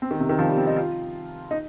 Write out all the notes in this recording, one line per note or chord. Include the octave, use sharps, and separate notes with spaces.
C4
D#3
C3
D#3
F3
G3
C4
D#4
F4
D#4